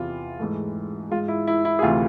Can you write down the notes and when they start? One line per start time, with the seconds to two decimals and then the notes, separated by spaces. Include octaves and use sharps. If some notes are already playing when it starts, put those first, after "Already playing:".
Already playing: E2 C3 E3 F4
0.39 G#2 E3 A3
1.11 G#2 G#3 F4
1.28 E4
1.47 E4
1.65 E4
1.79 G#4
1.82 D2 C3 E3 A3 F4